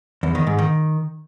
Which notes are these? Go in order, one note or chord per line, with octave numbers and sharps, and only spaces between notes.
E2
D#3
G#2
D#3